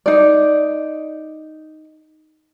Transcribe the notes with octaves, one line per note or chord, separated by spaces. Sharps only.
D#4 D5